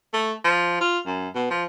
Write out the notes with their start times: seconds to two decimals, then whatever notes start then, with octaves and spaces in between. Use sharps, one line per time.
0.13 A3
0.44 F3
0.81 F4
1.06 F#2
1.35 B2
1.50 F3